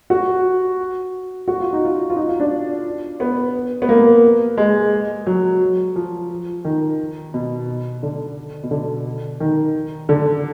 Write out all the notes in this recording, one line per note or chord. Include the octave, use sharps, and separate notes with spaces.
F#4
F#4
F4
D#4
F4
F4
D#4
F4
D4
B3
B3
A#3
G#3
F#3
F3
D#3
B2
D3
B2
D3
D#3
D3